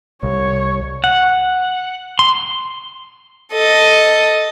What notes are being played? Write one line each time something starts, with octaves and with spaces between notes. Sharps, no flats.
C2 C#5
F#5
C6
A4 D#5